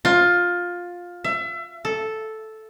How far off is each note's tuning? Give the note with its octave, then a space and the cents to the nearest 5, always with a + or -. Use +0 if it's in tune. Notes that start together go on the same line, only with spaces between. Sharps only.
F4 +15
E5 +30
A4 -5